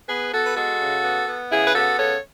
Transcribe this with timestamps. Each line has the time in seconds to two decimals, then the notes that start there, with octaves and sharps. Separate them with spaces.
0.09 B3 G#4 B4
0.33 B3 F#4 A4
0.45 B4
0.56 G#3 F#4 A4
0.80 C#3
1.03 B3
1.27 B3
1.51 C#3 E4 G#4
1.65 B4
1.74 B3 F#4 A4
1.98 C#3 A4 C#5